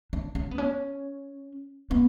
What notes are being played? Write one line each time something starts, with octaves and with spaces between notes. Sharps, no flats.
D4
C#4
B3
C#4
B3